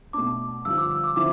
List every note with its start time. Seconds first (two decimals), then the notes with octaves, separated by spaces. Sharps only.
0.13 B2 A3 D4 D6
0.65 G2 D3 F3 E6
0.78 D6
0.91 E6
1.04 D6
1.16 D3 F3 C4 E4 D6